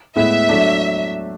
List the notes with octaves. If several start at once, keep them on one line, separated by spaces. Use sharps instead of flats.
A2 G#3 B3 E4 E5
F#3 A3 D4